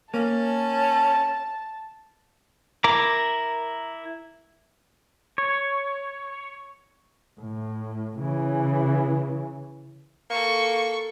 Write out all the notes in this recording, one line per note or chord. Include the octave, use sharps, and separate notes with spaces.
A#3 C#4 A5
E4 A#4 A#5 D6
C#5
A2
C#3 E3
A#3 A4 C#6